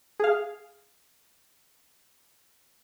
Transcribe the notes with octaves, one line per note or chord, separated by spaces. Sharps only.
G#4 F5